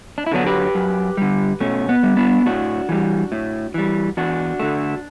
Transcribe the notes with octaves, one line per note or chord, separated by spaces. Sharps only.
D4
E4
D3 F#3 A3 B3 D4
G4 B4
F#2
D3 G3
B2 A3 C#4
B3
G3
B3 D4
A2 D4 F#4
E3 G3
A2
E3 G3
E2 D4 F#4
D3 A3